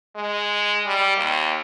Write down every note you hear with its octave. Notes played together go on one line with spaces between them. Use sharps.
G#3
G3
D#2